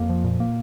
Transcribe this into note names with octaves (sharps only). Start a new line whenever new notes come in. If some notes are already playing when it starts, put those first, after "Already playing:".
Already playing: F2 A#3
F3
A#2
A#3